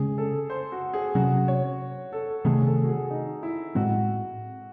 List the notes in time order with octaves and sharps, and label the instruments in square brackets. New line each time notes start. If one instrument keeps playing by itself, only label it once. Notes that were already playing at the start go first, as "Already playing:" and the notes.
Already playing: [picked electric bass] C#3 G#3 C#4 [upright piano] G#4
[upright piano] A4
C5
F#4
G#4
[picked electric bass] C3 F#3 C#4 [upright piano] F#4
[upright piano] C#5
A4
[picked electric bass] C3 D#3 A3 [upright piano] G#4
[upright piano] A4
F#4
G#4
D#4
E4
[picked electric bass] A2 G#3 C4 [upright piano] F#4